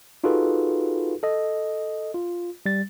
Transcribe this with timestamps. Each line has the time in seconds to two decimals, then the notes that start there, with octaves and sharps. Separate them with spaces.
0.24 D#4 F4 F#4 G#4 A4 B4
1.23 A4 D#5
2.14 F4
2.66 G3 A6